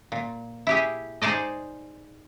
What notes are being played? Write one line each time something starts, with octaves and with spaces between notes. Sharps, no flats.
A#2
E4 G4 G#4
D#4 G#4 C5 D5 D#5